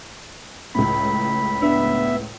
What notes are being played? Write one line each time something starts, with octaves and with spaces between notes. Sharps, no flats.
C#2 A2 B5
B3 D4 E5